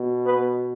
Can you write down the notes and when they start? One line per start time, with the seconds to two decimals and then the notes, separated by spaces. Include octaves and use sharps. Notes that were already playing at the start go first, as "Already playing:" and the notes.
Already playing: B2
0.26 B3 B4